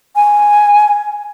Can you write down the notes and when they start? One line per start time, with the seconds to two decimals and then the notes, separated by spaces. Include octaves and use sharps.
0.16 G#5